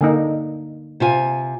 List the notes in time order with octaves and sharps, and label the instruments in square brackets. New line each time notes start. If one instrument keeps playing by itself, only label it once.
[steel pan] D3 A#3 D#4
[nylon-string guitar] C3 F4 G#5